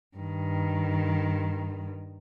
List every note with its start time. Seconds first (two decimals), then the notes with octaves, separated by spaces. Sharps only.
0.17 G2 D#3